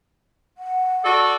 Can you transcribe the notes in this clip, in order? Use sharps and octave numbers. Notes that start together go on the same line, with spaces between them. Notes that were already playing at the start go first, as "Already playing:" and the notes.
F#5
F#4 A4 D5